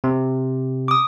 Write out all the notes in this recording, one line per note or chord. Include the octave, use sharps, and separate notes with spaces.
C3
D6 D#6